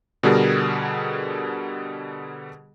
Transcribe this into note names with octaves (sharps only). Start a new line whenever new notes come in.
B2 D3 G3 G#4 A#4